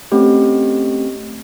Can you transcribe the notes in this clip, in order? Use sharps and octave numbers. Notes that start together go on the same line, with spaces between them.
A3 C4 C#4 G4